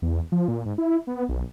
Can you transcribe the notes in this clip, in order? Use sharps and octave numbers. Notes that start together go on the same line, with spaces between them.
E2
F3
A#2
G#2
E4
B3
B1